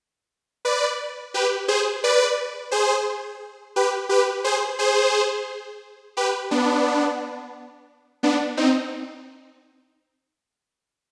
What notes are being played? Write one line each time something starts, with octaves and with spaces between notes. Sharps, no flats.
B4 D5
G4 B4
G#4 C5
B4 D5
G#4 C5
G4 B4
G4 B4
G#4 C5
G#4 C5
G4 B4
B3 D4
B3 D4
C4 D#4